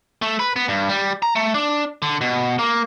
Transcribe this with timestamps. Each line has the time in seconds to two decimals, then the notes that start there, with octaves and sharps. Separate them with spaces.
0.22 A3
0.39 B4
0.56 B3
0.68 G2
0.89 G3
1.22 A#5
1.36 A3
1.54 D4
2.02 D3
2.21 B2
2.59 A#3